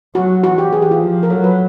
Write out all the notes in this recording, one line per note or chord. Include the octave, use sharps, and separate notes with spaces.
F#3 F#4
E3 F#4
G4
E3 G#4
G4
F4
F3
A#4
F#3 A4
B4